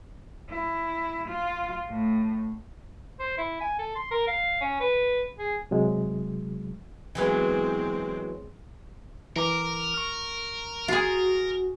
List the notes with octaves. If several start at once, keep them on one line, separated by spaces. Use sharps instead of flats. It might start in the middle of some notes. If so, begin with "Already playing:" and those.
E4
F4
A2
C5
E4
G#5
A4
C6
A#4
F5
C#4
B4
G#4
C3 F#3 G#3
E3 F#3 G#3 B3 C4
E3 A#4 A#5 D6
C#6 F6
F4 F#4 G#4